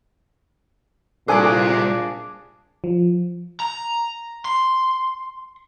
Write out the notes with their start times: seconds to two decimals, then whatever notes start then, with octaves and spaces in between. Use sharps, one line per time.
1.28 A#2 G3 D4 G#4 A4 C5 G#5 D6
2.84 F3
3.60 A#5
4.45 C6